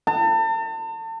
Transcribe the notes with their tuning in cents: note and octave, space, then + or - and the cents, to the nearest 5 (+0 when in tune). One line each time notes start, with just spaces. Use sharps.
A5 +40